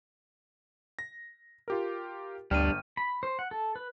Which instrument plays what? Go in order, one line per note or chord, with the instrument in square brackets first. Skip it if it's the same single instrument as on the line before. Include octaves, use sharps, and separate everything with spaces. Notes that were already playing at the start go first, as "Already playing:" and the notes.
[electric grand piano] A#6
F4 G4 A#4
[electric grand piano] G1 G5 [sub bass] D2 [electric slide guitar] G3 D4 [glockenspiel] F6 D#7
[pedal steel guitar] B5
C5
F#5
A4
B4